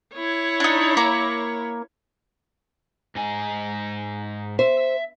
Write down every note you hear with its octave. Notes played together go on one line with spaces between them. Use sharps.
E4 C#5
D4 D#4
A#3 A#5
G#2 D#4 G#5
C5 E5